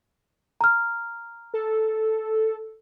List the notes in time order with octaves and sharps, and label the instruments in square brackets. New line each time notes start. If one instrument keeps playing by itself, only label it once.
[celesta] A#5 F6
[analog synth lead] A4